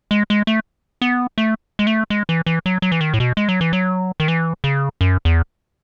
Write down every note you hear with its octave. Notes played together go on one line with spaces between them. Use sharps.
G#3
G#3
A3
B3
A3
G#3
A3
G#3
E3
E3
F#3
F#3
E3
D#3
A2
B2
G#3
F#3
E3
F#3
D#3
E3
C#3
F#2
E2